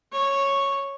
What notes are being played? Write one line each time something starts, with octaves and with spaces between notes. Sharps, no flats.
C#5